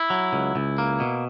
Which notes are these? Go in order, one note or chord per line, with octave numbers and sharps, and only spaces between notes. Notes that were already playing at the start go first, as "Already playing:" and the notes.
Already playing: E4
F#3
C#2
C#2
A#3
B2